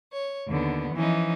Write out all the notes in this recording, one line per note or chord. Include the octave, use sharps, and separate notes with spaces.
C#5
D#2 D3 B3
E3 F3 C#4 D#4